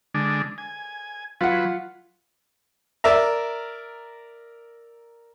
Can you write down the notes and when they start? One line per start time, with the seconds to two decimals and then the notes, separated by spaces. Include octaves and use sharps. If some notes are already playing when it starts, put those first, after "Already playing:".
0.14 D3 G#3 D4
0.58 G#5
1.41 F#3 F4 B4 F#5
3.04 A#4 D5 E5 A#5